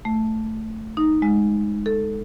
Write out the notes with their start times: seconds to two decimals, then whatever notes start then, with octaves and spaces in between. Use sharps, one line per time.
0.05 A3
0.97 D#4
1.22 G#3
1.86 A4